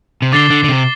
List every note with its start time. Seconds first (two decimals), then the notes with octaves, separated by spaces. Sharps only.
0.22 C3
0.32 D3 D6 A6 C7 G7
0.50 D3
0.64 D3
0.69 C3